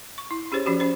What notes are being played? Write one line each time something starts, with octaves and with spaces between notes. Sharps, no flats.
C#6
E4
C#4 G4 G#4 C5 C#5
F3 C#4 F#4 G4
C#4 C5